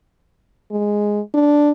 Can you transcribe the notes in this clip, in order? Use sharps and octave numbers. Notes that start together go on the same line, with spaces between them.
G#3
D4